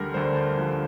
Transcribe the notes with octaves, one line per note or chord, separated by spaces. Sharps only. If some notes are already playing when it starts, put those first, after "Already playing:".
Already playing: D2 D3 G3 A#4
D2 D3 G3 C5
D2 D3 F3